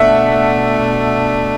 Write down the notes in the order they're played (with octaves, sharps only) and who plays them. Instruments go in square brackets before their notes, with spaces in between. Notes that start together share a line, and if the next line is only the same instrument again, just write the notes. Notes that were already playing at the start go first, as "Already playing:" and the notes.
Already playing: [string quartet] B2 A3 D4 [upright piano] E5 F#5